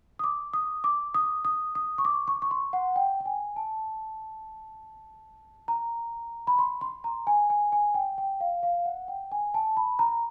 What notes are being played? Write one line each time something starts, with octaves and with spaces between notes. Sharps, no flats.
D#6
D6
D#6
D6
D#6
D#6
D#6
C#6
D6
C#6
C#6
C6
F#5
G5
G5
G#5
A5
A#5
B5
C6
C6
A#5
G#5
G#5
G#5
G5
G5
F5
F5
F#5
G5
G#5
A5
B5
A#5